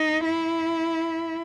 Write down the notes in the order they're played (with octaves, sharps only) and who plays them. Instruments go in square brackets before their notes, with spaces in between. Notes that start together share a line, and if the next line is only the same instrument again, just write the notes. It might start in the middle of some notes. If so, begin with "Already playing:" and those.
Already playing: [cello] D#4
E4